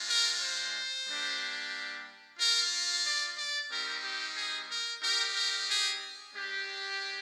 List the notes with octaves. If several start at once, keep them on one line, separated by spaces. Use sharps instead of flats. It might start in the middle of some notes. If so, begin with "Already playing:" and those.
Already playing: G#3 D4 F4
A#4
C5
G3 A#3 D4 G4
A#3 F4 A#4
D5
D5
G3 C4 D#4 G4 A#4
G4
G#4
A#4
C4 D#4 G4 A#4
A#4
G#4
G#3 D4 G4